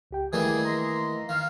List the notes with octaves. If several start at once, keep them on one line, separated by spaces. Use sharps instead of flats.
C#2 G4 G5
D#3 E3 G3 A3 A#3 G#4 A#4 B4
D#5 A#5 C6
D#3 F5